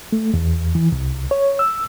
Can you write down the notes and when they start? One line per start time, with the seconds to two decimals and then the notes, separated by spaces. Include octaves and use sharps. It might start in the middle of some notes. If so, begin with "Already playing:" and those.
0.12 A3
0.34 E2
0.75 E3
0.92 C2
1.31 C#5
1.59 E6